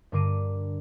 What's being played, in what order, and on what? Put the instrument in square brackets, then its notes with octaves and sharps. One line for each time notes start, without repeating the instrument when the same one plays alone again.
[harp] G2 D3 A#4 D6 C7 D#7